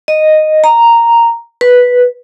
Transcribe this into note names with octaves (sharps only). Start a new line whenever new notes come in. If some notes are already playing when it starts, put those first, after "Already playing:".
D#5
A#5
B4